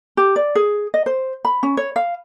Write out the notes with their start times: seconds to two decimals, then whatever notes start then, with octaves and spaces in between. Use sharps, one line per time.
0.17 G4
0.36 D5
0.55 G#4
0.94 D#5
1.06 C5
1.45 B5
1.63 C#4
1.77 C#5
1.96 F5